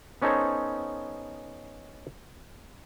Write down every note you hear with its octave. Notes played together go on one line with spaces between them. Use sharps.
B3 C#4 D#4 A4 C5 C#5